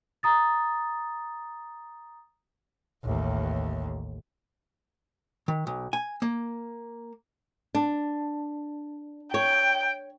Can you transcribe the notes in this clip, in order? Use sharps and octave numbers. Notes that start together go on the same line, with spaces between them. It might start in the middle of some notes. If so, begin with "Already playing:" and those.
A#5 D#6 A6
A1 D#2
D#3
B1
G#5
A#3
D4
C#5 G5